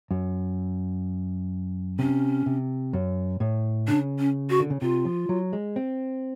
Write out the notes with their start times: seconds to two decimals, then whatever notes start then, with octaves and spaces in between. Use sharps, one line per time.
0.11 F#2
1.99 C3 C#4
2.46 C3
2.93 F#2
3.40 A2
3.88 C#3 D4
4.19 C#4
4.50 F#4
4.60 D3
4.70 C#3
4.82 C3 F4
5.05 F3
5.29 F#3
5.53 G#3
5.76 C4